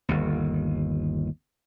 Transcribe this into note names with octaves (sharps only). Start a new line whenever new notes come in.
G1 D#2